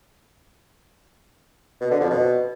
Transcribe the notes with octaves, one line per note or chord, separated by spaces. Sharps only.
B2
D3
F2
B2